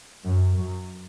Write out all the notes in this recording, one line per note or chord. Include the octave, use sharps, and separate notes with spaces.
F#2
F#2